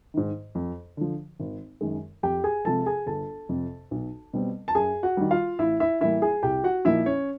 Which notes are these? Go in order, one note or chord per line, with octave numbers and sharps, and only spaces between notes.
G#2 D#3
F2
D3 F3
G#1
F#2 D#3 G#3
F2 G4 G5
G#4 G#5
C3 F3 G#3 A4 A5
G#4 G#5
G1 A4 A5
F2 C3
B1
B2 G3 C4
A5
F#2 G#4 G#5
F#4 F#5
D#3 G3
F4 F5
A1 E4 E5
E4 E5
A2 E3 G3 A#3 E4 E5
G#4 G#5
C2 G4 G5
F#4 F#5
A#2 F3 A#3 D#4 E4 E5
C#4 C#5